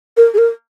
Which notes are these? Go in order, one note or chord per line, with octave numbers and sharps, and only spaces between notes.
A#4
G#4
A#4